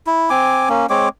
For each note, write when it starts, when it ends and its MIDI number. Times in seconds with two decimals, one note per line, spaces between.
0.07 0.29 64
0.30 0.69 60
0.30 0.69 80
0.30 0.69 86
0.69 0.86 58
0.69 0.86 61
0.90 1.09 56
0.90 1.09 60
0.90 1.09 73
0.90 1.09 86